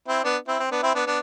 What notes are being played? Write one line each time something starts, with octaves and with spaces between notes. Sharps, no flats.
C4 E4
B3 D4
C4 E4
C4
B3 D4
C4 E4
B3 D4
B3 D4